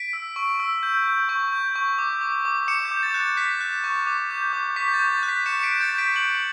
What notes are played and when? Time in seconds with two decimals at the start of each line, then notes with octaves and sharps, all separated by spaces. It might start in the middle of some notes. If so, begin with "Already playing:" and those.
Already playing: B6 D7
0.13 E6
0.36 C#6
0.60 E6
0.83 G6
1.06 G6
1.29 C#6
1.52 G6
1.76 C#6
1.99 D6
2.21 D6
2.45 D6
2.68 D6 C#7 E7
2.85 G6
2.91 D6
3.03 A6
3.14 F#6
3.20 A6
3.37 F#6 B6
3.61 F#6
3.84 C#6
4.07 D6
4.31 G6
4.53 D6
4.76 C#6 B6
4.88 G6
4.94 A6
4.99 C#6
5.11 A6
5.23 F#6
5.29 B6
5.46 C#6 C#7 E7
5.59 C#7
5.63 B6 D7
5.69 G6
5.81 A6 C#7
5.93 G6
5.98 B6 D7
6.15 G6 D7 F#7